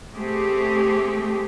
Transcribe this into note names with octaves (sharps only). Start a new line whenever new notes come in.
A3 C4 G4 G#4